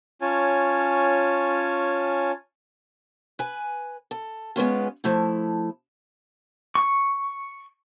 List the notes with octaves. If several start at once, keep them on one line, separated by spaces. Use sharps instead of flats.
C#4 F4 C#5 G#5 A5
B4 G#5
A4
G#3 B3 C#4 F4
F3 A3 E4
C#6